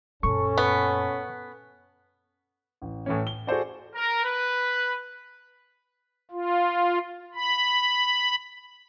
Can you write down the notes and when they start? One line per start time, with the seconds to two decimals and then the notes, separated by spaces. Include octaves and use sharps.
0.23 F#2 A#2 C#4 A4 C#6
0.58 B3
2.82 A1
3.06 A2 E3 C#4
3.27 G7
3.47 F#4 G#4 A4 C5 D5
3.95 A#4
4.24 B4
6.31 F4
7.35 B5